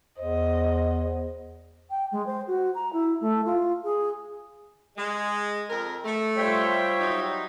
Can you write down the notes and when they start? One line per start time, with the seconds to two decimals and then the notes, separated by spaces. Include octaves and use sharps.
0.19 E2 C5 D#5
1.90 G5
2.12 G#3
2.26 C5
2.48 F#4
2.75 A#5
2.93 E4
3.21 A3
3.45 F4
3.84 G#4
4.97 G#3
5.70 F2 A#4
6.05 A3
6.37 G3 F4 C5 C#5 E5 G5
7.00 F#3 D#4